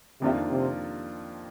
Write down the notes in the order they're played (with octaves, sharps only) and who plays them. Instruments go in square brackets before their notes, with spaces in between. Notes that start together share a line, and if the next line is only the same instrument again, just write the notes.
[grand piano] F2 D#3 A#3 D4 F4 [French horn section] C3
[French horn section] C3